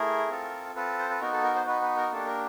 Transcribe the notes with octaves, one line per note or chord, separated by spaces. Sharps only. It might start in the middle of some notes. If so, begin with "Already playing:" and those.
Already playing: A3 E4 G#4 A#4
C4 F4 A4
C4 F4 A4 B4
C5
B4
B3 D#4 F#4 A#4
A4
A#4
C5
B3 D#4 F#4 B4
B4
A#4
A#3 D4 G4 A4
A#4